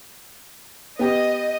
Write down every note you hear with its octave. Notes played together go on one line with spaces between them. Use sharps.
B3 G4 D#5